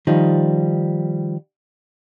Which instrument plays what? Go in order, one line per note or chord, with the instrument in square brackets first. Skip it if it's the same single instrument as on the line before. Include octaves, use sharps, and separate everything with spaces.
[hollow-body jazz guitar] D#3 F3 G3 D#4